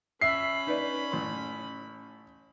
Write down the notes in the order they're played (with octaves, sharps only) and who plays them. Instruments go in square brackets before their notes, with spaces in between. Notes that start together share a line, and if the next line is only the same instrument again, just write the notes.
[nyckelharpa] C#4 B5 [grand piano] E5 C7
[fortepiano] D#4 B4 D5
A1 C6